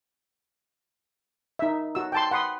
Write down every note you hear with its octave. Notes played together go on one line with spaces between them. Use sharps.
D#4 E5
F#4 E6
G5 A5 C6
F#5 B5 C6 D#6